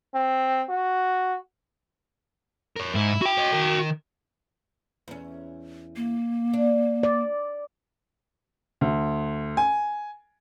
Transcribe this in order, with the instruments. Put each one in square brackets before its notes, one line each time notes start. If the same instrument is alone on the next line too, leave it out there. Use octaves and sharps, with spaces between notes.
[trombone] C4
F#4
[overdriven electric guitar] A#4 C#5
[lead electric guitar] G#2 [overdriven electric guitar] E4
[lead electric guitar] F#4 G5
[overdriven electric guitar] C#5 D#5
D#3 A#4
[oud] E2 C#4
[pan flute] A#3
[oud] D4
[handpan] D5
[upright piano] D2
G#5